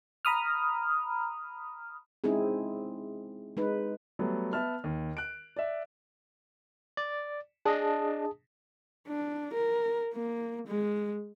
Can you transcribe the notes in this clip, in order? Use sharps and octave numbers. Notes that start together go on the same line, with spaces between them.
A#5 B5 D#6 F6
G#3 C4 C#4 D#4 E4 G#4
G#3 D#4 B4
F#3 G3 A3 B3
B3 E5 A5 F6
D#2
F#6 D7
D5 E5
D5
D4 G#4 D#5 A5 D#6
D4
A#4
A#3
G#3